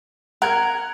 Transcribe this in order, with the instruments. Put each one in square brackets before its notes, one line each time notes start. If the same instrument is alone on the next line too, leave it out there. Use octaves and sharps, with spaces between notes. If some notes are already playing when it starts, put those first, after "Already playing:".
[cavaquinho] A#4 [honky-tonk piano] F#5 F#6 G#6